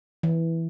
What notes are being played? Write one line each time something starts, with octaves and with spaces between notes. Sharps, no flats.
E3